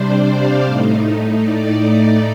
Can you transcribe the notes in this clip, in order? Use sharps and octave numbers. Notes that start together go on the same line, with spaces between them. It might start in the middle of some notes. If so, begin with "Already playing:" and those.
Already playing: C3 G3 D4 C5 D5
F5
A2 A3 D#4
D5